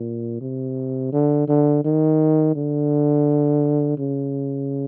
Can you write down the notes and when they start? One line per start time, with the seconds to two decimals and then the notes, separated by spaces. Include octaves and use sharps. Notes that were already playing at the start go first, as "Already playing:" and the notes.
Already playing: A#2
0.41 C3
1.12 D3
1.48 D3
1.84 D#3
2.55 D3
3.98 C#3